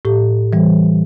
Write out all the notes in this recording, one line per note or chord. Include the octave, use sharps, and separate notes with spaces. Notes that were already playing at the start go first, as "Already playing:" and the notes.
A2 G4
E3 G3